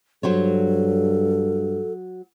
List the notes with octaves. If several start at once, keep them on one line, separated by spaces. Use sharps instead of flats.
G2 F#3 A4 C5 C#5